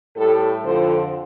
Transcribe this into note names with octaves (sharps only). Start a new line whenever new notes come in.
A2 G3 A4
F2 D3 F3 C5